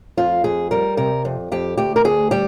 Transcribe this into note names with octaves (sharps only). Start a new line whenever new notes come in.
F2 F4
F2 G#4
G3 A#4
C3 A#4
F2
F2 G4
D2 G4
A#4
D2 G#4
G3 G4